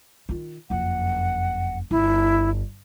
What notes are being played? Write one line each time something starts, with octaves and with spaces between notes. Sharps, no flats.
D#3 F4
F#1 F2 F#5
G1 E4